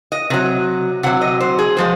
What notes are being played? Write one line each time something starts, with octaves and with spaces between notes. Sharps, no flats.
D#5
C3 F#3 D#5
C3 F#3 F#5
D#5
C5
G#4
F3 G#3 C5